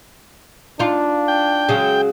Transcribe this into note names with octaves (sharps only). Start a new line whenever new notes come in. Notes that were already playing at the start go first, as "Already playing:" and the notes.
D4 D#4 F4
G5
C#3 F#3 G#3